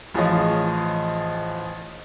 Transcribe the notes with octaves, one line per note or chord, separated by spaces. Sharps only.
A1 F3 G#4 C#5 D#5